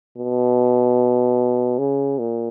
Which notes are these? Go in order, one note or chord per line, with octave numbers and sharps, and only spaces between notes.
B2
C#3
A#2